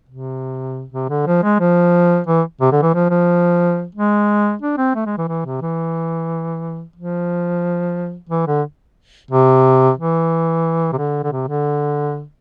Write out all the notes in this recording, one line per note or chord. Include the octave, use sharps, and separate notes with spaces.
C3
C3
D3
F3
G#3
F3
E3
C3
D3
E3
F3
F3
G#3
D4
C4
A3
G#3
E3
E3
C3
E3
F3
E3
D3
C3
E3
C3
D3
D3
C3
D3